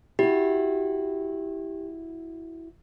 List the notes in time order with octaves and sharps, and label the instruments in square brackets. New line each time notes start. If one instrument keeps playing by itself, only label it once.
[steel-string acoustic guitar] E4 F#4 [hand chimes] G4